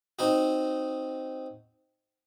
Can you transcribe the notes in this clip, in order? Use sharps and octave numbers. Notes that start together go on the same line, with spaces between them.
C4 D#4 F#4